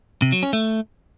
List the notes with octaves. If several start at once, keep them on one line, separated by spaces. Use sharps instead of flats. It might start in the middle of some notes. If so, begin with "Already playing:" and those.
C3
F#3
C#4
A3